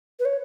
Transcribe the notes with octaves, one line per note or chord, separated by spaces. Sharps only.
B4
C#5